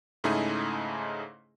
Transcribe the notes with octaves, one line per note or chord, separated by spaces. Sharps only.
G#2 C#3 A3 D#4 E4 G#4